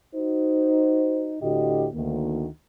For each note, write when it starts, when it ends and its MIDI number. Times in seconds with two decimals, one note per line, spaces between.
0.16 1.36 63
0.16 1.36 66
0.16 1.36 72
1.43 1.88 38
1.43 1.88 45
1.43 1.88 50
1.43 1.88 66
1.43 1.88 67
1.43 1.88 75
1.95 2.47 38
1.95 2.47 51
1.95 2.47 58